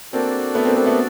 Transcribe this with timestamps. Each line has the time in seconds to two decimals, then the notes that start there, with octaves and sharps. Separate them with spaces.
0.13 A#3 C4 D4 F#4 A4 D5
0.55 A3 B3
0.65 A#3 C4
0.76 A#3 C4
0.86 A3 B3